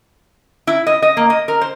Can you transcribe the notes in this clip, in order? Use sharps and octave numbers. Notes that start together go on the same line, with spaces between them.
E4
D#5
D#5
A#3
D#5
A#4
C5